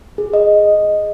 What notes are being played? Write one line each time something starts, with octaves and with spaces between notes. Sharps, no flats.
G#4
D#5